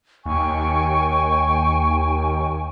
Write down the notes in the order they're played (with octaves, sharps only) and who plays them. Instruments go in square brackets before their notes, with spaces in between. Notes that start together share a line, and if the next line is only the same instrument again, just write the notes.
[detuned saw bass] D#2 [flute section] G5 G#5 C#6